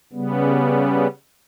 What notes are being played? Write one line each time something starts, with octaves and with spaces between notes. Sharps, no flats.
C#3 G3 B3